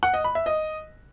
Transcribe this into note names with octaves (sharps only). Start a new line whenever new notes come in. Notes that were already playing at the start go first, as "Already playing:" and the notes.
F#5
D#5
B5
E5
D#5